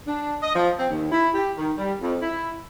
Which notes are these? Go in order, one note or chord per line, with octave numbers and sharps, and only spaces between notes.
D4
D#5
F3
C4
D#2
E4
G4
D#3
G3
F2
E4